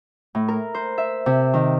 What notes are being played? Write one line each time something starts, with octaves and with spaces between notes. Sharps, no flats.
A2
A#4
C5
E5
C3
D#3